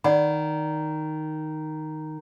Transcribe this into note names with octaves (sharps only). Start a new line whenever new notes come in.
D#3 D5 F#5 B5